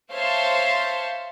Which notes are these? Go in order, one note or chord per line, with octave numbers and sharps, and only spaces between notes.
C5 C#5 E5 F5 A5 C6